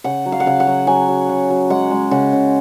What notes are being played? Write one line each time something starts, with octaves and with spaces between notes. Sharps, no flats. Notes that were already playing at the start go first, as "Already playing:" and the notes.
C#3 F#5
F#3
F5
F#5
C#3 F5
F#5
F#3
F#3 G#5
F#3
C#3
F#3
G#3 F#5
G#3
C#3 F#5
C#3